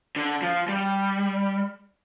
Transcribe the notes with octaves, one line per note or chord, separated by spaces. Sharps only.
D3
F3
G3